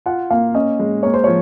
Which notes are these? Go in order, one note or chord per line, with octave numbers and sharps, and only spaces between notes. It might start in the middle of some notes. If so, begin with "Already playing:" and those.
F4 F#5
A#3 F5
C#4 D#5
G#3
A#3 C#5
C5
F3 C#5